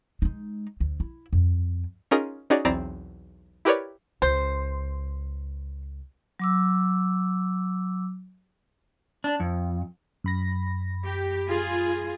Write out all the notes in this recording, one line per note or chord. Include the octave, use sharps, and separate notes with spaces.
G#3 D#4
D2
E4
F2
C#4 D#4 F4 G#4 A#4 D#5
C#4 D#4 F#4 G#4 C#5 D5
B1 E2 C4 E4 D5 A#5
E4 G4 A#4 B4 C#5 D5
C#2 C5
F#3 D6 E6
D4
F2
F#2 B5 A#6
G4
F4 G#4